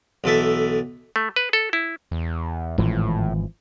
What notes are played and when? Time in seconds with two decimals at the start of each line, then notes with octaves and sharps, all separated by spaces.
0.24 B1 E3 A4 E5
1.16 A3
1.36 B4
1.53 A4
1.73 E4
2.11 E2
2.78 G#1 A2 E3 F3